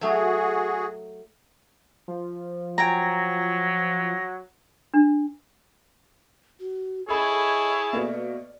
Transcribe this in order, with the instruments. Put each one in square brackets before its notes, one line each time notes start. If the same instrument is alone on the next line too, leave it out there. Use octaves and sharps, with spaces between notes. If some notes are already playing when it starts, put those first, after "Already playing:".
[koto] F#3 A3 [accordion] F#4 G#4
[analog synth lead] F3
[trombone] F#3 [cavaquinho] G5 G#5 A#5 [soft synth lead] A#6
[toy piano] D4
[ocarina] F#4
[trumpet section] E4 C#5 A5 [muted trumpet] G#4 [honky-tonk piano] A4 B5 [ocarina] D#5
[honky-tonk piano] B2 A3 A#3 [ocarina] D5